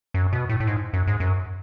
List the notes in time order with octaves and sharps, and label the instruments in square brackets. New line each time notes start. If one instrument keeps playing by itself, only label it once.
[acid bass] F#2
B2
A2
A2
G#2
F#2
G#2
F#2